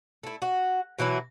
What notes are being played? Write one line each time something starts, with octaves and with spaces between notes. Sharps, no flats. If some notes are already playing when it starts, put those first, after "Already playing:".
A3 E4
F#4
B2 E3 F#3 E4